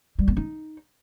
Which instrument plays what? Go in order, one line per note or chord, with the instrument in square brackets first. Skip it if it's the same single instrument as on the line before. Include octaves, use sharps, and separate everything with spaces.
[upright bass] G3
B3
D#4